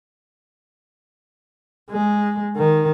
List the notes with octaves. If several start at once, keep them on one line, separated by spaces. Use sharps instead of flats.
G#3
D#3